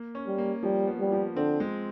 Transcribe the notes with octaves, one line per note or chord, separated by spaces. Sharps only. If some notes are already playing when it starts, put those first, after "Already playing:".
Already playing: A#3
C#4
G3
A#3
F3 G3
B3
G3
F3
D3 C4
G#3